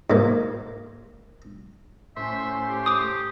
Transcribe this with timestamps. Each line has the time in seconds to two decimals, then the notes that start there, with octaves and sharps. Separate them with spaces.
0.10 G#2 A#3
2.17 A2 C#4 C5 E5 C6
2.68 G4
2.86 D6 D#6